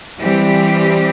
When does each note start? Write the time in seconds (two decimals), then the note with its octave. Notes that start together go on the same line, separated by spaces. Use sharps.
0.20 E3 G3 C4 G4